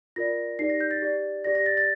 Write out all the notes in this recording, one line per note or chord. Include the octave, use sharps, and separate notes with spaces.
F4 A#4 D5 A#6
D#4 G4 D5 C7
A#6
G6
A6
G4 D5
G4 D5 A#6
A#6
A6
A6